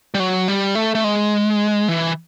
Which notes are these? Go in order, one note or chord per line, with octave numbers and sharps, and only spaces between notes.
G3
F#3
G3
A3
A3
G#3
E3